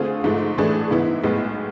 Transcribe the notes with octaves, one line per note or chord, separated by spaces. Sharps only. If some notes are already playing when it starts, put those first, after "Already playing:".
Already playing: D3 A3 C4 F4 G#4
G#2 F3 A3
A2 E3 A3 D4 G#4
G#2 E3 B3 E4
B1 A2 G#3 B3